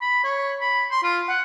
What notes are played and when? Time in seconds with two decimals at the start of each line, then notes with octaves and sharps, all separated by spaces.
0.02 B5
0.24 C#5
0.61 B5
0.91 C6
1.03 F4
1.29 F#5